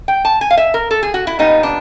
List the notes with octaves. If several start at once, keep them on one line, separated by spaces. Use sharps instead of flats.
G5
A5
G#5
F5
E5
A#4
A4
G#4
F#4
E4
A#2 G3 B3 D#4
D4